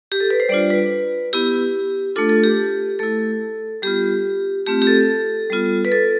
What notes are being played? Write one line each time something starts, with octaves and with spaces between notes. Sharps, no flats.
G4
A4
B4
C5
G3 D4 F4 D5
B4
B3 E4 G4
A3 D4 F4 A4
A4
G4
A3 E4 A4
G3 B3 F4 G4
A3 C4 F4 G4
G4
A4
G3 B3 F4
B4
A4